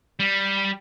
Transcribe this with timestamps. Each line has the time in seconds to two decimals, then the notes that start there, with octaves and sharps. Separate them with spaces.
0.20 G3